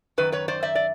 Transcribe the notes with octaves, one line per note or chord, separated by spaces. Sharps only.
F#2 D#3 B4
B4 C#5
C5 D5
D5 E5
D5